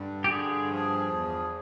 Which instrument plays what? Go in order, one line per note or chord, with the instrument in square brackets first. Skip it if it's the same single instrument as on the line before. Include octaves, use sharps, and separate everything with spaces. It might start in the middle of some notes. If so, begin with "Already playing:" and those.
Already playing: [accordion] G2 D3
[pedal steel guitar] G4
[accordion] G2 [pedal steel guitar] G#4
[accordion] F3
E2